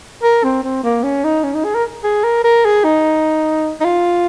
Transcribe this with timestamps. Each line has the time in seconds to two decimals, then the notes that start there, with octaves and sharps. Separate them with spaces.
0.23 A#4
0.44 C4
0.63 C4
0.83 A#3
1.03 C#4
1.24 D#4
1.44 C#4
1.55 D#4
1.64 G#4
1.75 A#4
2.04 G#4
2.24 A#4
2.44 A#4
2.65 G#4
2.84 D#4
3.80 D#4
3.85 F4